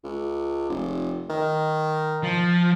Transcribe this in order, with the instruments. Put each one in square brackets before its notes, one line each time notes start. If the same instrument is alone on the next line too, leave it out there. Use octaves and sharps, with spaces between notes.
[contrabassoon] C#2
F1
D#3
[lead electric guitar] F3